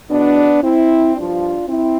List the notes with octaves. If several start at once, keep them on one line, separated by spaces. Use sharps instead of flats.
E2 B2 B3 D4
C4 E4
G2 F3 D4 F4
C4 E4